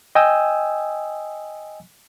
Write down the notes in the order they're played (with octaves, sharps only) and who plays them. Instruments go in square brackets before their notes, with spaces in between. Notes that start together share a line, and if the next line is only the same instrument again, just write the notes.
[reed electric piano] D#5 G5 G#5 D#6 E6